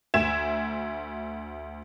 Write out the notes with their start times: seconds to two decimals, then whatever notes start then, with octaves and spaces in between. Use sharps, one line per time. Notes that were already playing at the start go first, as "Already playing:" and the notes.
0.14 D2 E5 G#6 E7